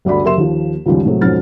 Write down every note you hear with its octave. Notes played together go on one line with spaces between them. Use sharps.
G1 D2 D5 B5
F#1 G4 A#4 E5 C6 E7
D#2 F3
C#2 F#2 D#3 F3 G3 G4
A2 C3 F#3 G#3
F2 G#2 B2 C#4 F6 A6